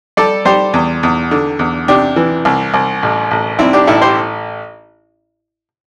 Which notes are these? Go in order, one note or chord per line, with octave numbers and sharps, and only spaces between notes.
G3 A4 D5
G3 G4 C5
E2
E2
D3
E2
C3 D4 G4
E3
C2
C2
A1
A1
G3 C4 E4
D4 G4
A1 E4 A4
G4 C5